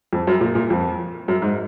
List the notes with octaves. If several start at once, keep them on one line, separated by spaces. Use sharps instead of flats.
F2
F#2
A#2
A#2
F2
F#2
G#2